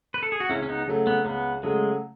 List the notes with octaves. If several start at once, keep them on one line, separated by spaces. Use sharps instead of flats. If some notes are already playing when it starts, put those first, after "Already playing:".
B4
A4
G#4
F#4
C#2 C#4 E4
C#4
B3 D#4
C#3 F#3 A3
B3
C#2 B3
C#3 F#3 G#3 A3